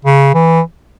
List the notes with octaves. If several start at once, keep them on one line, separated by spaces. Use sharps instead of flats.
C#3
E3